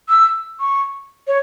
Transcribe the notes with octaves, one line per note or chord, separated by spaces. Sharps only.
E6
C#6
C#5